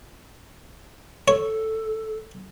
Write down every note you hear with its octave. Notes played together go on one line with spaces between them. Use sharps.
A4 C#5